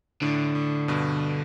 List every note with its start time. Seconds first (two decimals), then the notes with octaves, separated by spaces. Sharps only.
0.22 A2 D3
0.55 A2
0.88 G2 B2